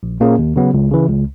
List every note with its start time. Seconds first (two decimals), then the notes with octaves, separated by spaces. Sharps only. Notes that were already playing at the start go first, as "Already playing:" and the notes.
0.03 A#1
0.20 A#2 A#3 C#4 G#4
0.38 D#2
0.56 C#3 F#3 B3
0.74 C#2
0.91 C#3 E3
1.09 C#2